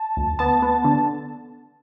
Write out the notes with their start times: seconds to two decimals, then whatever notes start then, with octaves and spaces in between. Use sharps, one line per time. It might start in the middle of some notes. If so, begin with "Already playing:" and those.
Already playing: A5
0.17 D2
0.39 B3 A5
0.62 B3
0.85 D3